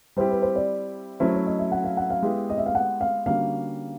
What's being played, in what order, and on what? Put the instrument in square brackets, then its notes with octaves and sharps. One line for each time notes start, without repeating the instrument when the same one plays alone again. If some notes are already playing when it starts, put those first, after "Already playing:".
[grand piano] G3 C4 E4 G4 [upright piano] C5
[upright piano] B4
C5
D5
[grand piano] F#3 A3 C#4 E4 [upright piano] C5
[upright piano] C#5
D#5
E5
F#5
F5
F#5
F5
[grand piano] G#3 B3 E4 G4
[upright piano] D#5
E5
F5
F#5
F5
[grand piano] D3 G3 A#3 C#4 F#4 [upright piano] F5